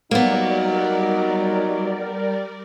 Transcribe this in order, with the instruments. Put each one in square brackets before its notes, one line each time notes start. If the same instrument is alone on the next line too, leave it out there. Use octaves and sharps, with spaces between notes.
[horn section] F#3 [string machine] G3 A#4 D5 [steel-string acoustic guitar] A#3 B3 [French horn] D#4